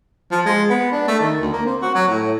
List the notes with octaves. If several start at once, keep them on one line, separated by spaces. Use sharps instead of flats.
F3
G#3
B3
D4
A3
D#3
D2
A#3
C4
F#4
F#3
A2